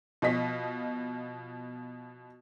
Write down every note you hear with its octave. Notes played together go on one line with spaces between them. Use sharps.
B2 F3 D#5 B6